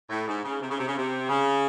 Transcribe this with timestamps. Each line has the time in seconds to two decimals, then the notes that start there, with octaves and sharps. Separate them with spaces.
0.10 A2
0.27 G#2
0.44 C#3
0.61 C3
0.70 C#3
0.78 C3
0.88 C#3
0.96 C3
1.29 C#3